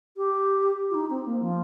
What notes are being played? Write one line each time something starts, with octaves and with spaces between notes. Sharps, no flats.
G4
F4
D#4
C4
A#3
F3